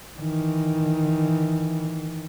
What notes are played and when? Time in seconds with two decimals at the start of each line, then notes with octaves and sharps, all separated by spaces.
0.19 D#3 E3